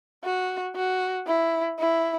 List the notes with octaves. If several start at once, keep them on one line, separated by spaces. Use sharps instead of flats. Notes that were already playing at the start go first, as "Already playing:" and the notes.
F#4
F#4
E4
E4